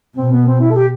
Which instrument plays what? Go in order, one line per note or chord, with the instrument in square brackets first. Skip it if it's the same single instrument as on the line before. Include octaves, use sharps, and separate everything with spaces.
[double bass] B2 [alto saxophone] C4
[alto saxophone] B3
C4
E4
A4
G4